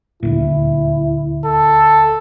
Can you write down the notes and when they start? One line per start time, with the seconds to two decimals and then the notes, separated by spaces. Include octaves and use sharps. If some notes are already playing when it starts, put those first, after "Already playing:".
0.23 D#1 D2 A#2 E4
1.46 A4